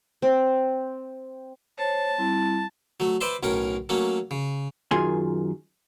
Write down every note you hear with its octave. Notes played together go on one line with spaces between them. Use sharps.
C4
C5 C#5 A5
G3 C4 E4
F#3 A3
B4 C5 D5 E5 A5 C6
B1 A2 C#4 A#4 A#5
F#3 A3 A#3 C#4
C#3
F#2 D#3 F4 G#4 G#5 C6